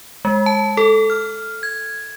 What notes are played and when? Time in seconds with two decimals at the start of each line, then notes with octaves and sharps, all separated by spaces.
0.25 G#3
0.46 A5
0.77 A4
1.10 F6
1.63 G#6